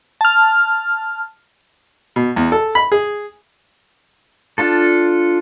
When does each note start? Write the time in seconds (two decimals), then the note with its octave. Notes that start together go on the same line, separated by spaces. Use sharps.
0.21 A5 F6
2.16 B2
2.36 E2
2.52 A4
2.75 B5
2.92 G#4
4.58 D4 F4 A4